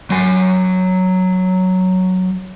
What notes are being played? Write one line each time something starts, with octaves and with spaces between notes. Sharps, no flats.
F#3 G#5